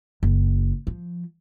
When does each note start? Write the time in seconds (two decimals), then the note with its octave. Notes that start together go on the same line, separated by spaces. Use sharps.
0.23 F#1
0.87 F3